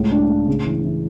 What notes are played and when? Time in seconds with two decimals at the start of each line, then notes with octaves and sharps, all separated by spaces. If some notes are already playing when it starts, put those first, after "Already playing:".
Already playing: C#2 A2
0.11 D4
0.29 A2
0.48 C#3
0.65 E3
0.84 E3